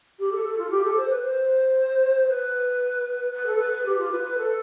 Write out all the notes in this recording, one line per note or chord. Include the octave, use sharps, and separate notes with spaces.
G4
A4
A4
F4
G4
A4
C5
B4
C5
B4
B4
A4
B4
B4
G4
F4
B4
B4
A4